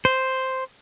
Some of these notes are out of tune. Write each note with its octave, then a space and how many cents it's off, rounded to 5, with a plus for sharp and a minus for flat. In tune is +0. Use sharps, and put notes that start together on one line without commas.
C5 +0